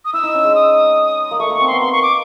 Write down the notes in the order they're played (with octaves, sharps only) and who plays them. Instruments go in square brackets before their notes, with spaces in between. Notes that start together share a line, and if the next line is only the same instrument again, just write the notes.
[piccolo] D#6
[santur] E4 [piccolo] E6
[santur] D#4
C#4
G#3
[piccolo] D#6
[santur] A#3
[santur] A3 [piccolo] C#6
[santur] A#3 [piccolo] C#6
[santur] C4
[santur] B3 [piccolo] C6
[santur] A#3 [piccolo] C6
[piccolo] C#6
D6